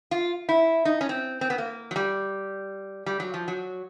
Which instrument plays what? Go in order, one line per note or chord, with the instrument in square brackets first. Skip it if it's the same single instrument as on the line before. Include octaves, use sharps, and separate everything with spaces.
[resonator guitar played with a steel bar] F4
E4
D#4
C#4
C4
C4
B3
A#3
F#3
G3
G3
F#3
F3
F#3